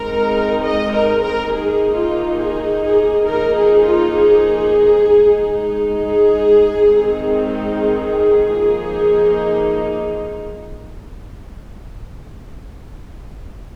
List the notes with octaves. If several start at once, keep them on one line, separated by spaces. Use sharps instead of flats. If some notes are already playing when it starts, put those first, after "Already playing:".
Already playing: G#3 C4 D#4 A#4
D#5
A#4
A#4
D#3 A#3 D#4 G#4
F4
G#4
G#4
F3 A#3 D#4 A#4
G#4
F4
G#4
G#3 D#4
G#4
D#3 G#3 C4 D#4
G#4
F3 A#3 D#4